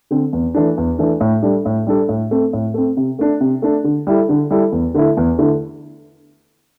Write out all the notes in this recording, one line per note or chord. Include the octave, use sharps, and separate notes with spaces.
D3 C4
E2
E3 A3 D4
E2
E3 A3 D4
A2
G3 D4 A4
A2
G3 D4 A4
A2
A3 C4
A2
A3 C4
C3
A3 D4
C3
A3 D4
D3
G3 E4 A4
D3
G3 E4 A4
E2
D3 A3 E4
E2
D3 A3 E4